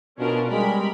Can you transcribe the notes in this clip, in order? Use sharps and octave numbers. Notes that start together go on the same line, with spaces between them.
B2 C#4 D4 F4 A#4
G3 G#3 A#4 B5